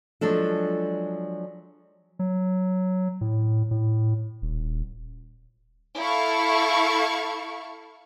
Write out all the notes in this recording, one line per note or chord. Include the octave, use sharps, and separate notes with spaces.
F3 F#3 G#3 D4 A4
F#3
A2
A2
D#1
E4 A4 F5 C#6